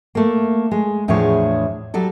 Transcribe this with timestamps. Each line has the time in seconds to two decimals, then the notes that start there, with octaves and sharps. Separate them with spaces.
0.15 A3 A#3
0.71 G#3
1.08 E2 A2 F3 D4 G#4 C#5
1.94 F#3 G3 A4